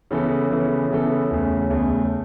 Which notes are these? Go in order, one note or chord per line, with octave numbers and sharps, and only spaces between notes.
C#3 E3 B3 A4
C#3 E3 B3 A4
C#3 E3 B3 A4
E2 C#3 A3
E2 C#3 A3